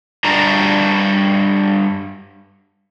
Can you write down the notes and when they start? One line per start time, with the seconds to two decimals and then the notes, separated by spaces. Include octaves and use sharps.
0.24 G2 D4 F#4 A#5